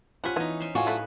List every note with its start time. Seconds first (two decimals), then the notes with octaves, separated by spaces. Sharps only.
0.24 F3 G3 C#4 F4 F#5 B6
0.36 E3 F3 B3 D#4 G#5
0.60 C#4 C5
0.75 A2 F4 F#4 F5 G#5 C#6
0.87 F#3 A3 B4